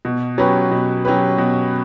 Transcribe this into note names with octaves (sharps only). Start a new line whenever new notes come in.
B2
F#3 C#4 G4 B4
B2
F#3 C#4 G4 B4
B2